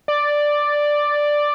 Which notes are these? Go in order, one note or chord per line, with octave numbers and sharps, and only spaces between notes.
D5